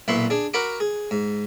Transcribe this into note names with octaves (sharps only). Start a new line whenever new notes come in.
B1 A#2 E4 B4 C6 C#6
D4 G#4
F#4 A#4 F#5 B5 C#6 D6
G#4
G#2